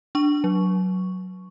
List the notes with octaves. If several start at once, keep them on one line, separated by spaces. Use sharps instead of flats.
D4 C#6
F#3